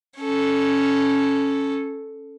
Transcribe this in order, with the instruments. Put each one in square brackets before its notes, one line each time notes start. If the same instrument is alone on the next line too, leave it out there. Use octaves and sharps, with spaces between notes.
[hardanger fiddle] C#4 A4